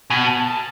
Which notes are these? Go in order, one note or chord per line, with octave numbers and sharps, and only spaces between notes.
B2 G#5
A5
A5
A5